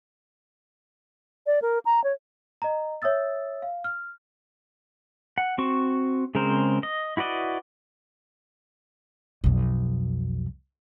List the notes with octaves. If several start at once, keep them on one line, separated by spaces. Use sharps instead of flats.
D5
A#4
A#5
C#5
D#5 A#5
C#5 E5 D#6 E6 A6
F5
F6
F#5
C4 F#4 C#6
C#3 G#3 C4 A#4 C5
D#5
E4 F#4 B4 D5 D#5
B1 F2